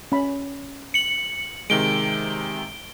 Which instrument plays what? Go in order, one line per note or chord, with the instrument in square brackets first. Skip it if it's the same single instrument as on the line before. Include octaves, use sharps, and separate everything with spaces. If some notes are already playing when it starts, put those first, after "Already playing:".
[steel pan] C#4 B5
[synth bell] C#7 F#7
[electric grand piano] C3 D#3 G#3 [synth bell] D7 G7